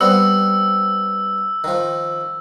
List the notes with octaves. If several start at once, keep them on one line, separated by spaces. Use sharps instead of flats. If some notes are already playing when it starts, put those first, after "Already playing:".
G3 B3 C4 E6
D#3 F3